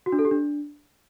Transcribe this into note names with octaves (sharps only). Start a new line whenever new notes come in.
F#4
D4
A4
G4
D4